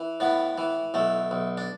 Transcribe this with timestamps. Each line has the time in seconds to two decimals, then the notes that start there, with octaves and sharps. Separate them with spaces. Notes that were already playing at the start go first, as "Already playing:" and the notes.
Already playing: E3
0.20 A2 B3
0.58 E3
0.94 B1 A3
1.31 B1
1.58 D4